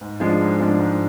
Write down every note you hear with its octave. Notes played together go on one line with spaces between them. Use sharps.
G#2
F3 G#3 D4
G#2
F3 G#3 D4
G#2